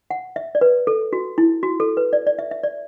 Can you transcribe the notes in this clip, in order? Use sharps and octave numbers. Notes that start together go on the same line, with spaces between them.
F#5
E5
D5
B4
A4
F#4
E4
F#4
A4
B4
D5
D5
E5
E5
D5